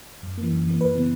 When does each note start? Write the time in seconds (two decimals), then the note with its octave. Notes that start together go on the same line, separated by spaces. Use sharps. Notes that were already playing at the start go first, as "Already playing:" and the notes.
0.23 F#2
0.38 A#3
0.43 E3
0.53 F#2
0.67 E3 A#3
0.80 F#2 B4
0.95 C#3 E3 B3